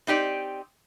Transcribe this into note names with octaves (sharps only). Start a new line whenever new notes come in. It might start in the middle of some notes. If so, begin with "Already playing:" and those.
C4 D#4 G4 D5